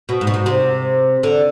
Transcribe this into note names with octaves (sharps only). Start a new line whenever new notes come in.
B2
G#2
B2
G#2
C3
D3